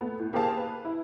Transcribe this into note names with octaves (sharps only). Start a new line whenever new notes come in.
A3 B3
A2
A#3 G4 G#4 C5 F5 A5
B4
E4